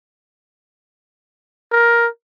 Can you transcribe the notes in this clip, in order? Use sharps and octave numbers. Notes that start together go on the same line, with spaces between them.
A#4